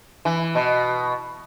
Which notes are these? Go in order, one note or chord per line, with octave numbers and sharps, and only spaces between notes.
E3
B2